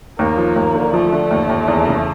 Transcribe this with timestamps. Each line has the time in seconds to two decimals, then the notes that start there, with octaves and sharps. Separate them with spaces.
0.19 D#2 A#3
0.37 F3
0.56 D#2
0.74 D3
0.93 F3 A3
1.12 D3
1.31 D#2
1.49 D#2
1.68 E2
1.87 C#3